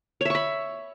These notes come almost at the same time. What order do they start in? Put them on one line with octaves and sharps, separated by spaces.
C#5 E5 C#6 B5